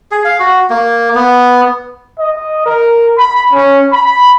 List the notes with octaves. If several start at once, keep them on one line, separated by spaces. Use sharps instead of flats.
G#4
F5
F#4
A#3
B3
D#5
A#4
B5
C#4
B5